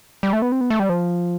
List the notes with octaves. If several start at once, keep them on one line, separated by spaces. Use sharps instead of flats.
G3
A3
B3
C4
B3
A3
G3
F3